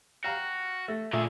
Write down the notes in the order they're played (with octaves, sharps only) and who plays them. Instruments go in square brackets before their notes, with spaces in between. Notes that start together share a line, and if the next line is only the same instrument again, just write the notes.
[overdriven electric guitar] F#4 [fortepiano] F5 G5 A#5
[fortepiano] A3
[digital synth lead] A#2 [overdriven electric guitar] D3 G#4 [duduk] A3